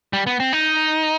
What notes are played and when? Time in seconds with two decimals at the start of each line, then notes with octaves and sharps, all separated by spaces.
0.13 G3
0.27 B3
0.40 C4
0.53 D#4